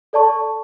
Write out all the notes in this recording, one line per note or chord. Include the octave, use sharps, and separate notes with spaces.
A4 D5 A5 C#6